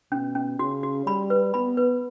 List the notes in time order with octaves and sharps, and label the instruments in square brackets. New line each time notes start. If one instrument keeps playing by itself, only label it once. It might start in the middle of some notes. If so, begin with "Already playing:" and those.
[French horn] B2 [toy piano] C#4
[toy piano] C#4
[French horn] C#3 [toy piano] F#4
[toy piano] F#4
[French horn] G3 [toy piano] B5
[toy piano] B4
[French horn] B3 [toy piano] B5
[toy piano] B4